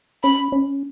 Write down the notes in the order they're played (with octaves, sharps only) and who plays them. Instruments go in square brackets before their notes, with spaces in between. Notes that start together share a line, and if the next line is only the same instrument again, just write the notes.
[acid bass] C#4 [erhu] B5
[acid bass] C#4